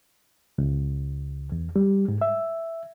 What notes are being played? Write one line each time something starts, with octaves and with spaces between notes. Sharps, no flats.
C#2
E2
G3
G#2
E5